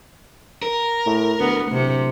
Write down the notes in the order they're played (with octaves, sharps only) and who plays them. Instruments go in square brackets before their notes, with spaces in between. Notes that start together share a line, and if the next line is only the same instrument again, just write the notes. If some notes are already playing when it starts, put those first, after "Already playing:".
[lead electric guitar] A#4
[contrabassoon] A2
[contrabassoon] D2 [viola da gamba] B3
[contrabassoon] D1 [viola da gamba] C3